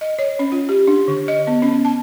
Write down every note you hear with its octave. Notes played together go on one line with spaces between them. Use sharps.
D#5
C#5
C#4
F4
G4
D4
D3
D#5
B3
C#4
A5